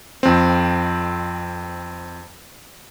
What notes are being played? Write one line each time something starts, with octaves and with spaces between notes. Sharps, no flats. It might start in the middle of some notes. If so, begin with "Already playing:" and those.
F2 C4